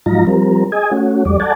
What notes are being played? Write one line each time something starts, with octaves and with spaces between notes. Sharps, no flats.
G#2 F3 F#3 D#4 F4 A#5
F3 G3 C4 A#4
G#4 D#5 G#5
A3 C#4 F#4
E2 G3 D5
A4 D5 F#5 G#5 A5